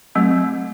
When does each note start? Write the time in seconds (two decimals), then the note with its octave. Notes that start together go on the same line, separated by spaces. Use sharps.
0.15 F#3 A3 C4